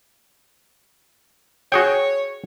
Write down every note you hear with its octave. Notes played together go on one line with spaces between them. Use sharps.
F#4 G#4 C#5 G5